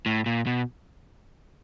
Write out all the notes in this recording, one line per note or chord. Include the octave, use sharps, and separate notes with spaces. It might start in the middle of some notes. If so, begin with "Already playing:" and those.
A2
A#2
B2